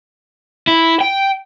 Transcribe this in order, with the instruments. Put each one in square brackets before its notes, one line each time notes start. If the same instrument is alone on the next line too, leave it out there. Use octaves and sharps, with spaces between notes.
[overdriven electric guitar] E4
G5